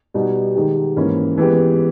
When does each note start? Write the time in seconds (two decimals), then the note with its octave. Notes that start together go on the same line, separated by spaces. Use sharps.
0.14 B2 G3 B3 D#4 G4
0.55 D#3 G#3 D#4 G4
0.96 G#2 E3 A#3 C#4 E4
1.38 E3 G#3 B3 G4